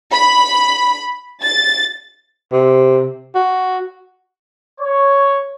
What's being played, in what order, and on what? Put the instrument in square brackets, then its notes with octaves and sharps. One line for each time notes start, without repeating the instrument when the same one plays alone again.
[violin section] B5
A6
[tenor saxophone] C3
F#4
[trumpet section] C#5